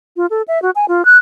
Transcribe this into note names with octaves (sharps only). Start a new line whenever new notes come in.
F4
A4
E5
F#4
G#5
F4
F#6